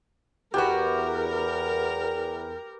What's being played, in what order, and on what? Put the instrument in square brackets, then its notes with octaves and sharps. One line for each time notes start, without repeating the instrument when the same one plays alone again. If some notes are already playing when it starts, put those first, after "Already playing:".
[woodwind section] E2 [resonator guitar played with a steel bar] B3 F#4 [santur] G4 B4 [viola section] A#4